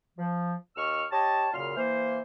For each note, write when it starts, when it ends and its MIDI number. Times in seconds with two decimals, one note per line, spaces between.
0.18 0.53 53
0.76 1.04 39
0.76 1.04 75
0.76 1.04 85
0.76 1.04 88
0.76 1.04 89
1.11 1.47 67
1.11 1.47 73
1.11 1.47 75
1.11 1.47 81
1.53 1.73 42
1.53 1.73 46
1.53 1.73 49
1.53 1.73 84
1.53 1.73 89
1.76 2.21 52
1.76 2.21 58
1.76 2.21 72